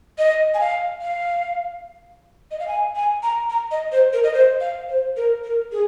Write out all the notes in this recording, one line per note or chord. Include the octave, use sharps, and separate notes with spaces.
D#5
G#5
F5
F5
D#5
F5
G#5
G#5
A#5
A#5
D#5
C5
A#4
D#5
C5
F5
C5
A#4
A#4
G#4